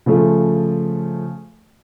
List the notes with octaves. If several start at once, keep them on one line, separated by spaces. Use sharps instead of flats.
C#3 F3 A3